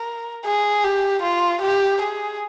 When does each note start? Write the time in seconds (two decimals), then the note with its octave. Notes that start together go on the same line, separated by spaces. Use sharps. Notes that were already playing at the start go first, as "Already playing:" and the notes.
Already playing: A#4
0.45 G#4
0.84 G4
1.23 F4
1.62 G4
2.02 G#4